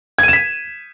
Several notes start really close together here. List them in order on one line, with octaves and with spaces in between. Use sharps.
G#6 D#7 E7 B6